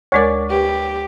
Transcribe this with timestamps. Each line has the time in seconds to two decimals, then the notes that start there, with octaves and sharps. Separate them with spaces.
0.12 D2 G#3 A#4 C#5 D5
0.50 G4 B4